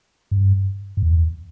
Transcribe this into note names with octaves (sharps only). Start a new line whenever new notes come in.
G2
G2
E2